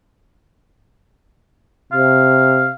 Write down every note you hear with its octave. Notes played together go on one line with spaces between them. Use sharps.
C3 F5